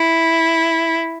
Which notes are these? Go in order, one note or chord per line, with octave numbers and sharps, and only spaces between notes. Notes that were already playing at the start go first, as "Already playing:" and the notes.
Already playing: E4